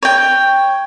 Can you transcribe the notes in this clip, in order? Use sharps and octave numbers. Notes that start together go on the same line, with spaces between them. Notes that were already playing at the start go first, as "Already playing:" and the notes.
C#5 G5